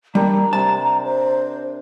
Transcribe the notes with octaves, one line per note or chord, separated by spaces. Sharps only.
G3 D4 A#4 A#5 B5
C3 A5
C5